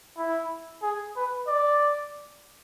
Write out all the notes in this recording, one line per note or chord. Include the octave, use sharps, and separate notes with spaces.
E4
G#4
B4
D5